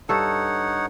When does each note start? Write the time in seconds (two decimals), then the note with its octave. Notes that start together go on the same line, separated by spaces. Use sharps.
0.09 G2 D#4 A4 C#5 F#5